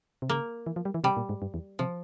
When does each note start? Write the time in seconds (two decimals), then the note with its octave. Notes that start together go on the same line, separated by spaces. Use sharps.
0.22 C3
0.29 C#3 A#3
0.66 E3
0.76 F3
0.85 G3
0.94 E3
1.04 C3 G3
1.17 A#2
1.29 G#2
1.42 G2
1.54 E2
1.79 C3 F3